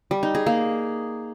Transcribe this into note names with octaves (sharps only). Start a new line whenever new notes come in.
G3
D#4
G#4
A#3